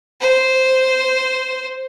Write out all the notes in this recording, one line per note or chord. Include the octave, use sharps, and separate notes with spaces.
C5